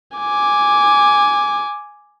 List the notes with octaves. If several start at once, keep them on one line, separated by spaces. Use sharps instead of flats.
G#5 D6